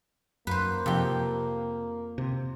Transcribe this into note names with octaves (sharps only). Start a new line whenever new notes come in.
F#2 A#3 B4 C5
F2 C3 G4
C3